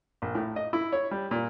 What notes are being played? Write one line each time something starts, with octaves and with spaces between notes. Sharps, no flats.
A#1
A2
D#5
E4
C#5
G3
A#2